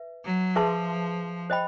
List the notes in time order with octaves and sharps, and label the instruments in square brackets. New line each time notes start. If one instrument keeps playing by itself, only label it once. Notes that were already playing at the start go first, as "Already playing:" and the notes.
Already playing: [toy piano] B4 E5
[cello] F#3
[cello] F3 [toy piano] G#4 B4 E5 A5 C6
[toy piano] C5 D#5 G5 B5